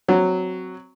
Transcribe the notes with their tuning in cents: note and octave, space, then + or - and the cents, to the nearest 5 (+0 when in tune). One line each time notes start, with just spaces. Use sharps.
F#3 +0 C4 -5